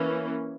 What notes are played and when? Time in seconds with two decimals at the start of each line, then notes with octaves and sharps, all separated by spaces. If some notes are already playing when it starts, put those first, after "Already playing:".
Already playing: E3 A#3 C#4